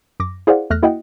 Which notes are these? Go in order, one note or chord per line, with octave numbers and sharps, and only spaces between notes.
F#2 D6 A#6
E4 G#4 C5 D5 F5 F#5
E2 A3 F6 F#6 A#6
A#3 E4 F#4 D#5 F#5 G5